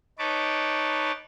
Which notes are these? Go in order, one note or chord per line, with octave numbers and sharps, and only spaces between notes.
D#4 B4 C#5 A5 D6